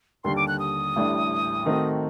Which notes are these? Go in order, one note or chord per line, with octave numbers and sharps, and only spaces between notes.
D#2 D3 G3 C6
D6
F#6
D#6
A1 A2 G3 D4
D#3 A3 C4 D#4 F#4